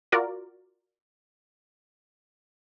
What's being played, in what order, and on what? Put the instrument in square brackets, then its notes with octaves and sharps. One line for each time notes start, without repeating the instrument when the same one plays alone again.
[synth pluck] F4 F#4 A#4 D5